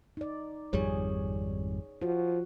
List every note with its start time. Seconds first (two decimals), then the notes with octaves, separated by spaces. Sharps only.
0.17 D#4 D5
0.73 G#1 F2 G3 G#4 C#5
2.02 F3 F#4